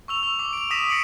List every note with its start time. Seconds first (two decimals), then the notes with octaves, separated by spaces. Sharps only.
0.08 C#6 E6 F7
0.23 E6
0.39 D6
0.53 D7 F7
0.70 D6 D#6 A#6 B6 D#7 E7
0.90 A#6 C#7 D7 F#7